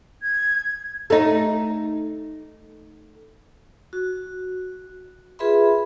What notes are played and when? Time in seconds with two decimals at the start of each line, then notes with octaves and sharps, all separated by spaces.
0.22 G#6
1.10 A3 D#4
3.93 F#4
5.39 F4 G#4 B4 E5 B5 C6